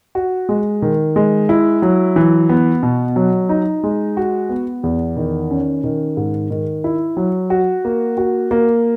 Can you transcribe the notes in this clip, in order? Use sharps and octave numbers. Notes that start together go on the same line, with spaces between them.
F#4
G#3
D#3
G#3
E4
F#3
E3
B3
B2
F#3
D#4
G#3
F#4
B3
E2
D#3
C#4
D#3
G#2
D#3
E4
F#3
F#4
A#3
F#4
A#3